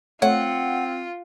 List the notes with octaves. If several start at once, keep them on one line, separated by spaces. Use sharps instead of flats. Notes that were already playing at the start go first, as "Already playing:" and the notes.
A3 C4 F4 C#5 F#5